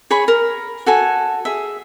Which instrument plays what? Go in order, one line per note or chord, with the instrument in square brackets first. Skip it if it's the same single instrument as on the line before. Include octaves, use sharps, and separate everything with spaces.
[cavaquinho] G#4 C#5 B5 C#6
A#4
F#4 A4 G#5
G#4 E5